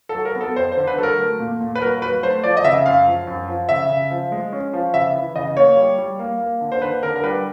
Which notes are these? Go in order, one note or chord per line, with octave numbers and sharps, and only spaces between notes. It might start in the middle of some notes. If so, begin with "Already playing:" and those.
A4
F#3
A#4
B3
A4
F2 C5
C5
D3
B4
F#3 A4
A#4
A3
A#2
A#2
B4
F#3 A#4
F#3 B4
A3 C5
F3 D5
D#5
C#3 E5
F#2 F5
F3
F#2
F3
C#3 E5
C#3
F3
G#3
C#4
F3
C#3 E5
E3
C#3 D#5
A#3 C#5
G3
G3
A#3
A#3
D3
C5
D3 B4
D3 A#4
A#4
G3 B4